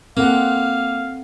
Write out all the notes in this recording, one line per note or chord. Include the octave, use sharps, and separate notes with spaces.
A#3 C4 A4 F5 F#5